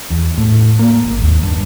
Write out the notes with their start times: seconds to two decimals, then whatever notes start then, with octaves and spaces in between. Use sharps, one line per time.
0.10 E2
0.38 A2
0.79 A#3
1.04 G#1
1.22 D#2
1.43 G2